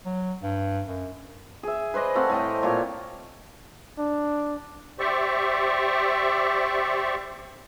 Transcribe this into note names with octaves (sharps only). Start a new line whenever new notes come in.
F#3
G2
F#2
G#4 E5
B4 C5 D5 D#5
A3 C4 F5 F#5
A2 D#5 G5
A#2 C#5 F5 D6
D4
G4 C5 D5 E5 C#6